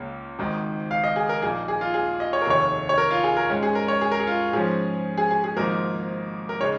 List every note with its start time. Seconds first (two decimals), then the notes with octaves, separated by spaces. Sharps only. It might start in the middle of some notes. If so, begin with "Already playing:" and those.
Already playing: C#2 C#3 A#3
0.39 G#1 G#2 D#3
0.91 F5
1.04 D#5
1.16 G#4
1.29 A#4
1.42 A#1 A#2 A#3 D#4 G#4
1.68 G#4
1.81 F4
1.94 G#4
2.20 D#5
2.33 C#5
2.42 A#4
2.46 F1 D#2 D#3 C#5
2.89 C#5
2.98 A#4
3.11 F4
3.24 G#4
3.37 A#4
3.50 G#2 G#3 C#4
3.63 G#4
3.75 A#4
3.88 C#5
4.01 G#4
4.11 A#4
4.20 G#4
4.27 F4
4.53 G#2 F3 C#4 G#4
5.18 G#4
5.31 G#4
5.44 G#4
5.57 G#1 G#2 F3 A#3 D#4 A#4
6.49 A#4
6.60 C#3 G#3 D#4 C#5